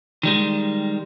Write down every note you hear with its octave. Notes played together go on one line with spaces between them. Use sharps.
D#3 G3 G#3